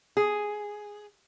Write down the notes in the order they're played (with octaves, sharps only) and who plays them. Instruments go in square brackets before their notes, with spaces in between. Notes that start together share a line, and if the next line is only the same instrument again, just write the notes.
[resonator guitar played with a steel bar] G#4